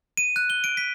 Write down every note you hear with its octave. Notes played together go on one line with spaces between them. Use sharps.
D#7
F#6
G7
D7
B6